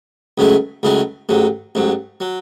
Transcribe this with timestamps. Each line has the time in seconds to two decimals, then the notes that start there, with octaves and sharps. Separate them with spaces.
0.38 C#2 C#3 F#3 A3 E4
0.83 C#2 C#3 F#3 A3 E4
1.29 A1 G#2 F#3
1.75 A1 G#2 F#3
2.20 F#3